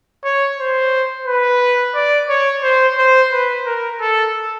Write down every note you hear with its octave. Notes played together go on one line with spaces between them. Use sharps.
C#5
C5
B4
D5
C#5
C5
C5
B4
A#4
A4